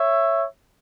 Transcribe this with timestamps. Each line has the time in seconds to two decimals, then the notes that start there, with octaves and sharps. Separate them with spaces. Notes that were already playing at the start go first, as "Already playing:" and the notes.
Already playing: C#5 E5